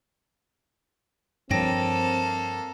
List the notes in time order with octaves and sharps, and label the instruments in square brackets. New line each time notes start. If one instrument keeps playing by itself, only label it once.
[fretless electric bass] G2 F3 [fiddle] A#3 A4 [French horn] C4 [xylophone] C#5 G5 A#6